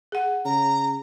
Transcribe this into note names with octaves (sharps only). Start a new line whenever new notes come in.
G#4 F#5
C#3 A#5